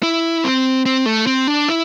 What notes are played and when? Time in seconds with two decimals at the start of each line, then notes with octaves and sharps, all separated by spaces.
0.03 E4
0.44 C4
0.86 C4
1.06 A3
1.27 C4
1.47 D4
1.69 E4